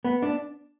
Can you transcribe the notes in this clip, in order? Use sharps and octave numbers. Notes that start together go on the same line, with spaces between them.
B3
D4